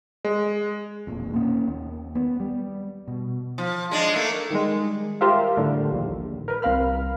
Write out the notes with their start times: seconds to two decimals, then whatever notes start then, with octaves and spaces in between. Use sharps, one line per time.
0.25 G#3
1.07 E1 A#1 F2
1.34 A#3 C4 C#4
1.68 D#2
2.15 B3
2.40 G3
3.08 B2
3.58 F3
3.91 G#3 D4
4.13 A3 A#3
4.50 D#3 G3 G#3
5.21 F4 G4 A#4 C5 E5 F5
5.57 A2 D3 G3
5.92 A#1 D#2
6.48 A#4 B4
6.62 C2 C4 A#4 F5 B5 F6